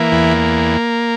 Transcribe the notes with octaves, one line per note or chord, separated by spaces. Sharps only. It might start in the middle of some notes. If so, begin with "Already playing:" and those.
Already playing: E3 A#3
E2